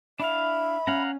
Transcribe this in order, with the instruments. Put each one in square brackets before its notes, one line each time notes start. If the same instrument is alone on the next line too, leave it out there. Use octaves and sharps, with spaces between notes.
[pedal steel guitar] D4 E4 F5 [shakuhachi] E5 [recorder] B5
[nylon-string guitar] C#4 [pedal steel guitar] F5 F#5 A#5